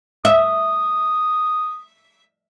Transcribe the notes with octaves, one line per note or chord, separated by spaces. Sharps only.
E5 D#6